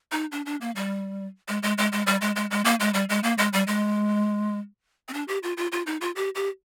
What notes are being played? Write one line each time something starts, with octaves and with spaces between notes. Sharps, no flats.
D#4
D4
D4
A#3
G3
G#3
G#3
G#3
G#3
G3
G#3
G#3
G#3
A#3
G#3
G3
G#3
A#3
G#3
G3
G#3
C4
D4
G4
F4
F4
F4
D#4
F4
G4
G4